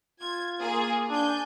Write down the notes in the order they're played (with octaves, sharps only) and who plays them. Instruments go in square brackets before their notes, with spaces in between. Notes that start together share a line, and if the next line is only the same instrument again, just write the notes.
[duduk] F4 [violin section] G#6
[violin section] A#3 G#4
[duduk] D4 [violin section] G#5 G6